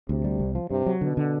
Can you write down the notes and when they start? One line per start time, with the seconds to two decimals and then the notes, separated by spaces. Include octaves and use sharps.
0.09 D2 C3
0.24 G3
0.40 C2
0.55 F3
0.70 G2 C3
0.86 F#3
1.01 B2 D3
1.17 D3